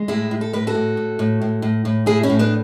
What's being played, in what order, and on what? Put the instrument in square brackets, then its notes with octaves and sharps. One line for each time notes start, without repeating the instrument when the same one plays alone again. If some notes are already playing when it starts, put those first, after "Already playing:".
Already playing: [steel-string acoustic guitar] G#3
A2 E4 G#4
A2
A4
A2 B4
F#4 A4
A2
A2
A2
A2
A2
A2
A2 E4 G#4
C#4 E4
A2
B3 D4